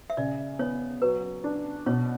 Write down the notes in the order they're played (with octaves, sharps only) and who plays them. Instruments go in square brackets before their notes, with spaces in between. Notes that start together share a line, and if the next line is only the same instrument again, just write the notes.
[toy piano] E5
[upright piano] C#3 [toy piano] D5
[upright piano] B3 [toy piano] C#5
[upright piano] F#3 [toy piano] B4
[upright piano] D4
[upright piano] B2 [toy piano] C#5